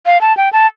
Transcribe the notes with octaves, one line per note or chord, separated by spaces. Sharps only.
F5
A5
G5
A5